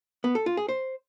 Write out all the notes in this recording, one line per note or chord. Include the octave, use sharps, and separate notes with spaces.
B3
A4
F4
G#4
C5